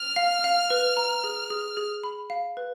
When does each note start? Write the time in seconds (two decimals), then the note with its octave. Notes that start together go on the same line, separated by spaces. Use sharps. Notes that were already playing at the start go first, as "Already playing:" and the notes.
Already playing: F6
0.16 F5
0.44 F5
0.70 B4
0.97 A#5
1.24 G#4
1.50 G#4
1.77 G#4
2.04 B5
2.30 F5
2.57 B4